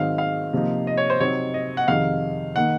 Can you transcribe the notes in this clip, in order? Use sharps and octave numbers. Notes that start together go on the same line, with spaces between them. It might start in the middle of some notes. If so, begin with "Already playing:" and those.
Already playing: G#2 D#3 F#3 C4 D#4 F5
F5
C3 F3 A#3 D#4
D#5
C#5
C5
C3 F#3 C4 D#4 C#5
D#5
F#5
F2 C3 D#3 G#3 D#4 F5
D#3 A#3 D#4 F#5